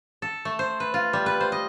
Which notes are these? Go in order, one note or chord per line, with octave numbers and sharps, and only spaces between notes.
A4
A3
C5
B4
F4
G3
B4
C5
D#5